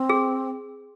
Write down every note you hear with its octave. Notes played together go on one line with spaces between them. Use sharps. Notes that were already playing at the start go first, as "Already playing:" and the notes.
Already playing: C4
G#4